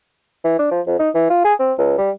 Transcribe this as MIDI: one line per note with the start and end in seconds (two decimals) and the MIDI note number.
0.44 0.58 52
0.59 0.70 62
0.71 0.81 53
0.87 0.96 41
0.99 1.10 63
1.15 1.25 52
1.30 1.43 65
1.45 1.54 68
1.60 1.73 60
1.79 1.95 37
1.98 2.11 55